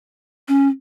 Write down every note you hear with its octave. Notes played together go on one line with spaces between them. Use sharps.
C#4